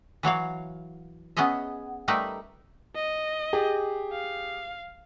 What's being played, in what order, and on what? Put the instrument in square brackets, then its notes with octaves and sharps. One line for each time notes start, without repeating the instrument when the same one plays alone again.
[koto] E3 F#3 C#5 F5
B3 C#4 G#4 D#5 E5
G3 A3 D#4 A#4 B4
[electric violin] D#5
[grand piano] G4 G#4
[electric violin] F5